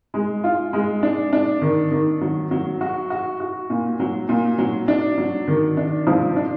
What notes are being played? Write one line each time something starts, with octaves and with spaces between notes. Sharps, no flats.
G#3
F4
G#3
D4
D4
D#3
D#3
F#3
F#3
F#4
F#4
F#4
A#2
F#3
A#2
F#3
D4
F#3
D#3
D4
F3
D4